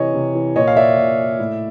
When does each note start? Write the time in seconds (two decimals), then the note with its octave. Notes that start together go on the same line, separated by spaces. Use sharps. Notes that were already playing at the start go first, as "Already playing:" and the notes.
Already playing: C3 E3 C#5 D#5
0.14 C3
0.35 E3
0.56 A#2 C#5 D#5
0.67 F5
0.76 D5 E5
0.97 A#2
1.39 A2